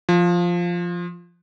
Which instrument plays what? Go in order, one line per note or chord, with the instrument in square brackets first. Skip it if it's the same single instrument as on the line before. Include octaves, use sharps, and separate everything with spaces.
[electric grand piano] F3